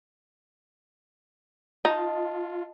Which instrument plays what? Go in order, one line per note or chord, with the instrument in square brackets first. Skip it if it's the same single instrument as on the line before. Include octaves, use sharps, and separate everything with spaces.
[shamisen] D#4 [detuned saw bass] F4 [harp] D#5 A5